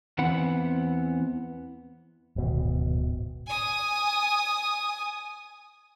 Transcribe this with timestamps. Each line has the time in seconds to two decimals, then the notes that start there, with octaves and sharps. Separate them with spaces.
0.18 E2 E3 B3 C4 F#5 B5
2.36 D1 G#1 B2
3.47 G#5 D#6